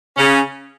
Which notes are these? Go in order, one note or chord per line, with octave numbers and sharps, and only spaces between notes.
C#3 C#4